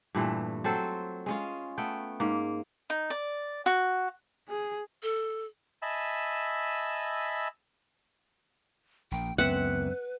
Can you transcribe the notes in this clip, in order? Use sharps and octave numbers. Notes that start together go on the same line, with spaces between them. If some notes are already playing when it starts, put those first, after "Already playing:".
G2 A#2 E3 A3
F#3 C4 A4 C5
G#3 C#4 F4
A3 B3 G5
G#2 A#3
D#4
D5
F#4
G#4
A4
D#5 E5 G#5 A5 B5 E6
A#1 G5
C#2 F#2 B3 C4 B4 E5 F#5